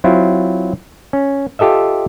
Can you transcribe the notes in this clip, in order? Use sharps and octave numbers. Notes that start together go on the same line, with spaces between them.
F#3 C4 E4 F4
C#4
F4 G4 A4 D#5 E5